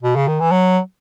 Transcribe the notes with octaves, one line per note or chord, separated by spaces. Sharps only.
B2
C#3
D#3
E3
F#3